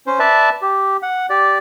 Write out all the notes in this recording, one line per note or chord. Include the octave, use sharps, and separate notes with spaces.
C#4 C5
B4 D5 E5 A5
G4
F#5
G4 D5